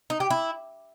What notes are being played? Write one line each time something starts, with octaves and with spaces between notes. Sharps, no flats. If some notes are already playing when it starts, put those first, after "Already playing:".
D#4
G4
E4